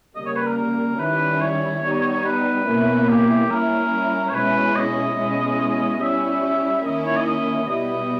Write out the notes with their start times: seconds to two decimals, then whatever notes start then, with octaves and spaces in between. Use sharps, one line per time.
0.15 C#3 G3 A#3 D#5
0.26 C#5
0.36 B4
0.47 A#4
0.57 A#4
0.99 D#3 G3 C#4 E4 B4
1.41 C#5
1.83 G3 B3 D#4
2.25 B4
2.66 B2 A#3 C#4 E4
3.09 G4
3.50 G3 A#3 C#4 E4 A#4
4.29 C#5
4.34 B2 G#3 C#4 E4 B4
4.76 D#5
5.17 B2 G#3 C#4 E4
6.01 G3 C#4 E4 E5
6.84 D#3 A#3 C#4 E4 D#5
7.06 C#5
7.16 D#5
7.27 D#5
7.68 B2 G3 B3 E4 D#5